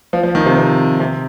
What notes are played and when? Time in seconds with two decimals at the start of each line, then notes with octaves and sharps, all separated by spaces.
0.13 F3
0.23 F3
0.35 D#3
0.46 C3
0.57 C3
1.00 C3